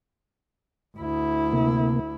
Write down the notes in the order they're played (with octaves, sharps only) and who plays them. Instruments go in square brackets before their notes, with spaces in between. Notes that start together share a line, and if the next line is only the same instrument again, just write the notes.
[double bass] D2 E4
[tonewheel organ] C3 A#3